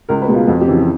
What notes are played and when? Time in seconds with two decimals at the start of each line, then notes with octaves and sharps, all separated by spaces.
0.09 C#2 A#4
0.22 B4
0.28 B2 G#3
0.35 F4
0.47 F2 F#4
0.61 G4
0.68 C#3 E3
0.73 G4